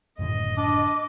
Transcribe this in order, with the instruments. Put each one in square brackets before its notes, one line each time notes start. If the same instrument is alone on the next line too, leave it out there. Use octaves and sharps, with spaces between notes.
[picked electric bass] F#1 A2 D3 [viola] D#5
[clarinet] D4 [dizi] D6